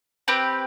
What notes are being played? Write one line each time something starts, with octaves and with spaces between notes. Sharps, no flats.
C4 G4 B4